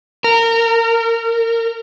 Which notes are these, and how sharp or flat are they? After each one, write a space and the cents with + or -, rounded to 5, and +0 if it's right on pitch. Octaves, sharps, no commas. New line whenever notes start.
A#4 -25